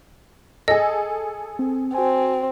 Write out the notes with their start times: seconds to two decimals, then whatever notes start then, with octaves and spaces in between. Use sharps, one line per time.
0.68 G#4 A4 D#5
1.59 C4
1.94 C4 F#4 G#5